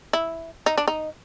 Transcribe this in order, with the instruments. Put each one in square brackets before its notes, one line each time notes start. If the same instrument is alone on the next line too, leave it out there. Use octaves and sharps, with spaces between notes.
[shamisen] E4
D#4
D4
D#4